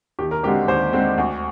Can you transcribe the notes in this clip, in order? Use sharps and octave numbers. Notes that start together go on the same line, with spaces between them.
D#2 G4
A#4
D3 G#3 C4 G4
D#2 C5
D3 G#3 C4
D2